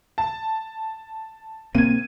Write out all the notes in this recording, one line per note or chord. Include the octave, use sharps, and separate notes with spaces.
A5
C3 A#3 C4 G#6 D#7